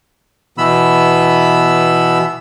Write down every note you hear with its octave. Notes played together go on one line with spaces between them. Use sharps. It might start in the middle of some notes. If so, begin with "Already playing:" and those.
B2 E3 B3 B5 E6